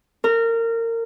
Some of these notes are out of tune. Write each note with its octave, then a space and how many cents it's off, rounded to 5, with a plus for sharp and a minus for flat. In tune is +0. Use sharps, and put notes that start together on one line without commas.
A#4 -25